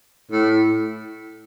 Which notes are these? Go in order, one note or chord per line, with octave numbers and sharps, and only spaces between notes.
A2